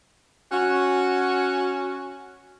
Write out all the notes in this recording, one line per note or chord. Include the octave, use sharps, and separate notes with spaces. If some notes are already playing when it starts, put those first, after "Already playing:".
C#4 F#4